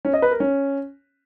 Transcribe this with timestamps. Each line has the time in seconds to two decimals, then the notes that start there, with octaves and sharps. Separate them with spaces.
0.05 C#4
0.14 D#5
0.22 B4
0.31 A#4
0.40 C#4